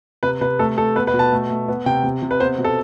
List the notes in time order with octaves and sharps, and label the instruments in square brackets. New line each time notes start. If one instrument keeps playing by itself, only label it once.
[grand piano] C3 B4
C3 B4
A3 A4
A3 A4
B3 B4
B4
B2
A5
A3
A3
B3
C3 G5
C3
C3
B4
B3 C5
B2
A4